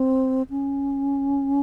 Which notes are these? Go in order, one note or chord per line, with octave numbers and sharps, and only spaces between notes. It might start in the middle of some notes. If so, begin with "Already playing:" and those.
Already playing: C4
C#4